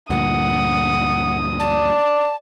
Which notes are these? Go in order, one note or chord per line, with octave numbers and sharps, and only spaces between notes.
D2 G2 A#2 F#5 D#6
D5 A5